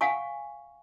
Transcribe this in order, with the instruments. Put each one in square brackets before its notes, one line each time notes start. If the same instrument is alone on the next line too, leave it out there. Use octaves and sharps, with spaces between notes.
[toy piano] F5 F#5 G#5 C#6